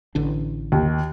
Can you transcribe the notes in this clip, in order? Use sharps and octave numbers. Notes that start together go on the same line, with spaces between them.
A1 D3 D4
D#2